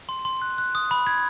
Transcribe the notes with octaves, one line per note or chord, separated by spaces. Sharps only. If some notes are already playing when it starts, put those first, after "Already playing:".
C6
C6
F#6
F#6
D#6
B5
G#6